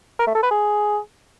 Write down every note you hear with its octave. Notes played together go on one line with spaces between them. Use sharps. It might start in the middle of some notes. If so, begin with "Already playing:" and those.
A#4
A3
A4
B4
G#4